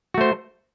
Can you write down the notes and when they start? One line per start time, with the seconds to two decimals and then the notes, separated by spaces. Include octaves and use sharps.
0.14 F#4
0.18 A3
0.21 C5